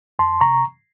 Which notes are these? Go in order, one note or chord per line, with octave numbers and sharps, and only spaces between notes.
F2 A5 C6
C3 A#5 C#6